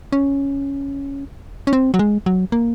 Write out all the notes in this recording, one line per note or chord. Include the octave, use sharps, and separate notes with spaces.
C#4
C#4
C4
F#3
G#3
F#3
A#3